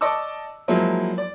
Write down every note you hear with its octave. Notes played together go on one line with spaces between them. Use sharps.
D5 D#5 A5 C#6 D6 E6
F3 F#3 G#3 A#3 E4
D5